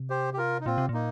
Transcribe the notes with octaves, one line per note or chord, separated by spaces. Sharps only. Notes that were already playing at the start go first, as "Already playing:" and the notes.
Already playing: C3
G4 C5
G4
F4 A#4
D#4
A#2 C4 F4
C3
A#2 A#3 D#4